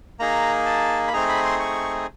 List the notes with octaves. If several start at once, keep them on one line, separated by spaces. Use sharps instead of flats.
A#3 D#4 G#4 A#5
A5
B5
A3 C4 D#4 G#4 A#5
B5
C6
C#6